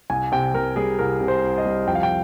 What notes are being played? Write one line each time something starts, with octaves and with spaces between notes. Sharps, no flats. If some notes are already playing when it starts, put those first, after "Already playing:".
C2 G#5
C3 G5
C2 A#4
G3 G#4
C2 A#4
C3
C5
C2
D#5
G3
F2 G5
F5
G5